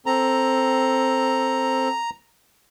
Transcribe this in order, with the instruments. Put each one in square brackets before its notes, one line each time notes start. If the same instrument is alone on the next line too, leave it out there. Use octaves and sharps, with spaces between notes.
[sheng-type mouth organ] C4 A4 [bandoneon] A#5